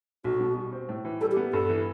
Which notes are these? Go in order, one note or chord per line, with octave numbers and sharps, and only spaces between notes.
B1 F#4
B2
G3
C4
A2
E3
G3 A4
G4
B3
G2 A4
E3